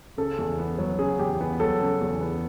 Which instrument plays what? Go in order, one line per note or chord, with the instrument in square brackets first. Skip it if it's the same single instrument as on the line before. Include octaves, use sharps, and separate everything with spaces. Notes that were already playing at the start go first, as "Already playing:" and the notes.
[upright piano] C#3 [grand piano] A4
[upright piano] E2
B3
F#3
[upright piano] C#3 [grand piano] G#4
[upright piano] E2 [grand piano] G4
[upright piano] B3
[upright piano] F#3 [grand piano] A4
[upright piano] C#3
E2
B3